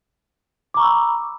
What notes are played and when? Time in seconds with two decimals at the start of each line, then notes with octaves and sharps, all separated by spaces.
0.74 D6
0.77 A#5
0.80 C#6
0.82 E6
0.85 B5